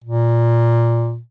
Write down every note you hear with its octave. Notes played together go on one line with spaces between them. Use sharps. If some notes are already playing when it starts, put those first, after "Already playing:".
A#2